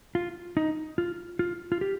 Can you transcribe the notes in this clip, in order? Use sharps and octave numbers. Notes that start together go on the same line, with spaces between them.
F4
D#4
F4
F4
F4
G4